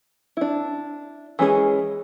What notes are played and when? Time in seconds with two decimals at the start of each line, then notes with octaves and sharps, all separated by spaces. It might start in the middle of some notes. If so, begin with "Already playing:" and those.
0.37 D4 E4
1.39 E3 G#3 C#4 E4 G#4